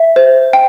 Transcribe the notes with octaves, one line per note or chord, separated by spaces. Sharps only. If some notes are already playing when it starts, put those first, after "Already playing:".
Already playing: E5
C5
G5